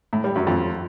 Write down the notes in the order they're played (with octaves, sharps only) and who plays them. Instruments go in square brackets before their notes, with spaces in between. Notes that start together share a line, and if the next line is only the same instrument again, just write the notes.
[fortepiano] A2
G3
F#2
F2